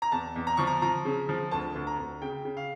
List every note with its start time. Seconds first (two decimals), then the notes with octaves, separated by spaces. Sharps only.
0.02 A#5
0.12 E2 A5
0.36 E2
0.47 A#5
0.57 F3 C#6
0.67 A#5
0.82 F3 A#5
1.05 C#3
1.29 F3
1.51 D2 A5
1.75 D2
1.87 A#5
1.99 D2
2.21 C#3 G5
2.45 C#3
2.57 F5